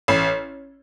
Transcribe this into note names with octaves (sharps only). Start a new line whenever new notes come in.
A1